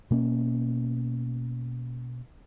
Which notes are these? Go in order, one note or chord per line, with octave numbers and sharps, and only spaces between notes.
B2 A#3 C#4